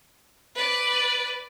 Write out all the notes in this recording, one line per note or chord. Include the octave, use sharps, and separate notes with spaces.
B4 D5